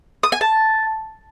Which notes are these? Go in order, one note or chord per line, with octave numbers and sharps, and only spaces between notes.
D#6
G#5
A5